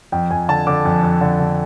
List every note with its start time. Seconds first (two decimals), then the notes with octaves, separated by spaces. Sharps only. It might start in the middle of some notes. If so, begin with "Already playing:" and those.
0.12 F2 G5
0.30 F2 G#5
0.49 D3 A5
0.67 D3 D6
0.85 F2
1.03 F2
1.21 D3
1.40 D3